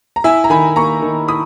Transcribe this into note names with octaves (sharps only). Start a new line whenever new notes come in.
A#5
E4 E5 G#5
A#5
D#3 G#5 B5
A#3 A#5 C#6
D#3
E4 B5 D#6